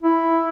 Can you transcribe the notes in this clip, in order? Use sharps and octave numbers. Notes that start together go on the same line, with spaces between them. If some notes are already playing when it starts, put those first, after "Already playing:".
E4